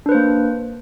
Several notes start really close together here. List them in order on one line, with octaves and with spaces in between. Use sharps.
D4 B4 C5 A#3